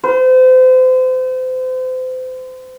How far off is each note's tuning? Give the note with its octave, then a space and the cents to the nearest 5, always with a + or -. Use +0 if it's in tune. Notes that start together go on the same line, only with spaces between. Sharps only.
C5 -35